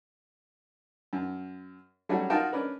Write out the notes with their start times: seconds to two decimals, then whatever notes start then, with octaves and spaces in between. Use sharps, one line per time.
1.13 F#2
2.09 F#3 G3 A3 C#4 F#4 G4
2.30 D#4 F4 F#4 A#4 G5 A5
2.52 C#4 D4 A#4 B4